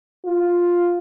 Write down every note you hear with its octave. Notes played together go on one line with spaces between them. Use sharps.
F4